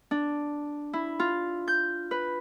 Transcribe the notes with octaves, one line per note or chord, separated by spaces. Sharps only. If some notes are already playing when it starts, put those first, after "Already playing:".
D4
E4
F4
G6
B4